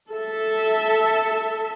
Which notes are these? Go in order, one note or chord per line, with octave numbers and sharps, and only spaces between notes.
A4 E5